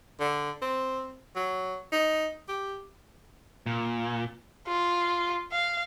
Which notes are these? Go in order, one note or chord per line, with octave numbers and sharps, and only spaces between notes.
D3
C4
F#3
D#4
G4
A#2
F4
F5